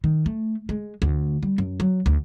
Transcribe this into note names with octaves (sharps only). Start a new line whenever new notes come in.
D#3
A3
G#3
D2
G3
F#2
F#3
D2